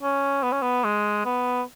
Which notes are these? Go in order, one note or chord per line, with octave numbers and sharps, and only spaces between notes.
C#4
B3
C#4
B3
G#3
B3